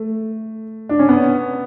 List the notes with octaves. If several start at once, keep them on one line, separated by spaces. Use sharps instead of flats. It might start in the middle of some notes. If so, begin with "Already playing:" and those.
Already playing: A3
D4
C#4
B3